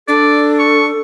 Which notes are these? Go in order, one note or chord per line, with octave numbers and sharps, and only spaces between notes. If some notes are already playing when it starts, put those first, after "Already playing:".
D4 A4 D5
C#6